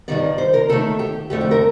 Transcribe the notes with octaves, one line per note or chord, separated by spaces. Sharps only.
G2 D#3 G3 D5
C5
A#4
D#2 D#3 A3 A4
G4
F2 D3 A3 G4
G4
A#4